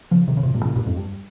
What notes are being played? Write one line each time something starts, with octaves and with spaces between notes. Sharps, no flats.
C#3 F3
C3 D#3
C#3
G#2 C3
G2 A#2
A#2 C#3
G2 A#2
F2 G#2
G2